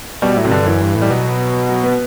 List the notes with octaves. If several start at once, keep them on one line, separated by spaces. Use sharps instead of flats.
B2 G3
A2 F#3
C3
G2 D3
F#2 E3
G2
A2
G3
B2 F#3
F#3
B3